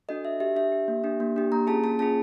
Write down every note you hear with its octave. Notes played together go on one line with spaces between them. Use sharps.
D4 F#4 A4 D#5
D4 E5
G4 E5
D4 E5
G4
A#3
D4 G4
A#3
D4 G4
A#3 A#5
C#4 F4 G#4 A5
A#3 A5
C#4 F4 G#4 A5